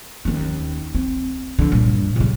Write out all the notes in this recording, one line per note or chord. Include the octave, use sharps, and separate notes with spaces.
D#2 C#4
C4
D3 E3
G2 A#2
C#3 G3